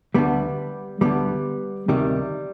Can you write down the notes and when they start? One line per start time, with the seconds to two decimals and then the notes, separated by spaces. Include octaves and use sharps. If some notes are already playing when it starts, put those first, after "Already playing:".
0.14 D2 D3 G3 B3
1.01 D2 D3 G3 B3
1.88 D2 C3 D#3 G3